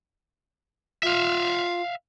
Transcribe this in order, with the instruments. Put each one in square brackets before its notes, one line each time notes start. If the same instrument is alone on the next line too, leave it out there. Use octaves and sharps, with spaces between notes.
[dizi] F4 [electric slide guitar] E5 F5